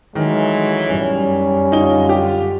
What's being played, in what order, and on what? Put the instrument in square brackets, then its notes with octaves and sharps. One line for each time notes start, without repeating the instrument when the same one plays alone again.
[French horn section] A2 E3 F#3 [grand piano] D#3 [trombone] G#3
[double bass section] F#2 G3 [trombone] C#4
[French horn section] D3 F4 [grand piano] D#4 G7
[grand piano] G4